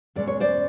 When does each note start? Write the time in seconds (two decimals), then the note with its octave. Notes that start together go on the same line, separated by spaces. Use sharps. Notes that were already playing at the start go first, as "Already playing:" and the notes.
0.15 E2 B2 G#3 C#4 D5
0.27 C#5
0.40 C5 D5